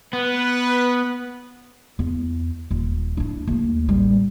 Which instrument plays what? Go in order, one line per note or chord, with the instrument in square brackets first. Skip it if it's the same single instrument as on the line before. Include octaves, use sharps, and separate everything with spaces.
[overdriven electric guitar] B3 [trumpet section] B4
[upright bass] E2
D#1
D4 E4
D#2 A3
A1 G3